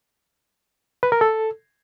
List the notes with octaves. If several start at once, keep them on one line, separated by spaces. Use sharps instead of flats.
B4
A#4
A4